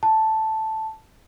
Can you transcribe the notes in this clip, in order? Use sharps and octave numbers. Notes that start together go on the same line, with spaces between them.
A5